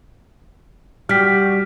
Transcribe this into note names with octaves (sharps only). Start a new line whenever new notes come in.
G3 F#4 G4 F6 B6